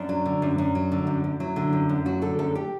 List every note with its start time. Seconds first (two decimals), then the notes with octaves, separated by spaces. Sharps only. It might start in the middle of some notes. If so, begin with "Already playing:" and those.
Already playing: F#2 D4
0.09 F#3
0.26 D3
0.42 F#2
0.58 F#2
0.75 F#3
0.92 D3
1.07 F#2
1.24 F#2
1.40 F#3 E4
1.56 D3
1.73 F#2
1.89 F#2
2.06 F#3 F#4
2.22 D3 A4
2.39 F#2 A4
2.55 G4